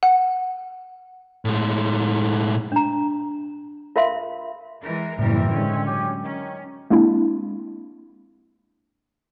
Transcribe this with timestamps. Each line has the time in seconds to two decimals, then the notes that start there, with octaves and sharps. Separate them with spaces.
0.03 F#5
1.45 A2 G#3
2.72 D4 A#5
3.96 F4 A#4 E5 F5 C6
4.82 E3 G#3 A#4
5.19 F#1 A2 E3 G3 C4 E4 A#4
5.53 D3 G#3 C#4
5.86 F#3 G4
6.23 D#3 C#4
6.90 G#3 A#3 C4 D4 E4